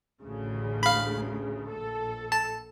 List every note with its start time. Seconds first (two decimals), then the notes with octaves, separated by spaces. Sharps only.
0.22 A1 D2 C#3
0.83 F5 B5
1.69 A#1 A4
2.32 A5